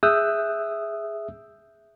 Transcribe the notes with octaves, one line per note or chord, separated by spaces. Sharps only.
G#4 E5 D#6 E6 F#6 G6